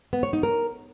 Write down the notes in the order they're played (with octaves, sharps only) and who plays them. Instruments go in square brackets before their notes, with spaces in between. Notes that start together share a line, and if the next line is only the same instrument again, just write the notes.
[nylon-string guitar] B3
C#5
D#4
A#4